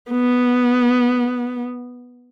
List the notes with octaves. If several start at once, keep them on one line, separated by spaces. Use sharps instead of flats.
B3